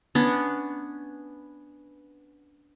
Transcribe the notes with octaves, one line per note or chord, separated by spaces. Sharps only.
B3 C#4 D4